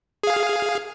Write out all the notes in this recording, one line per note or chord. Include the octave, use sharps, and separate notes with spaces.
G#4 F5